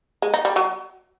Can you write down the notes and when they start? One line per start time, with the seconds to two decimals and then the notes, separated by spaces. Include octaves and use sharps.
0.22 G#3
0.34 D#4
0.45 G3
0.56 F#3